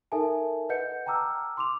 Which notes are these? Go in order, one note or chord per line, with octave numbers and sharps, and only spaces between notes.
D#4 A4 A#4 E5 G#5 A5
B4 D#5 F#5 G6 C#7
G5 A5 A#5 D6 E6 F6
C6 D6 F7